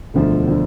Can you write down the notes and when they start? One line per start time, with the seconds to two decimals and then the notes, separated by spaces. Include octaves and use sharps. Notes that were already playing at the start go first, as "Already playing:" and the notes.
0.14 E1 D2 D3 F3
0.47 D3 F3